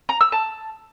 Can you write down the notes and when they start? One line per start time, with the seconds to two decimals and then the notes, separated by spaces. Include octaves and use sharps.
0.09 A#5
0.21 E6
0.32 A5